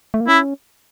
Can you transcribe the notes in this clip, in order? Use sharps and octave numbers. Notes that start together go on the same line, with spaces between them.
A3
A#3
C#4 E4